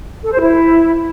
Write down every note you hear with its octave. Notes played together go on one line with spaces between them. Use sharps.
A4
C5
E4